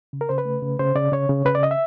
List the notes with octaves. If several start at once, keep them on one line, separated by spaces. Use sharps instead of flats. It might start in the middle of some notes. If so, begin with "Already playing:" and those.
C#3
A#4
C#3 C5
B4
A3
C#3
C#3 C5
C#3 D5
C#3 C#5
C#3
C#3 B4
D5
D#5
E5